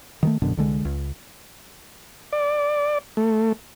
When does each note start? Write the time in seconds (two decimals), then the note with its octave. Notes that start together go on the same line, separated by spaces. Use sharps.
0.23 D#3 F#3 A3
0.42 A1 F#2 B2 D3
0.57 C2 D3 G#3
0.85 C#2
2.33 D5
3.17 A3